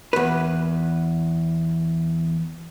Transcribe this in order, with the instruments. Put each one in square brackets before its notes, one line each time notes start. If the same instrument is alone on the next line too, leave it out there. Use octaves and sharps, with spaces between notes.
[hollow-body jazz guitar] E2 B4